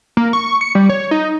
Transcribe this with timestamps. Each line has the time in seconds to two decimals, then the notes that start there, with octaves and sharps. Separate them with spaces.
0.17 A#3
0.33 C#6
0.61 C#7
0.75 G3
0.90 C#5
1.11 D#4